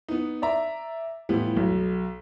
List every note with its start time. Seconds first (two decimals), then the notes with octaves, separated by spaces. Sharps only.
0.09 B3 D#4
0.42 D5 E5 A#5
1.29 A2 E3 F3 G3 B3
1.56 B1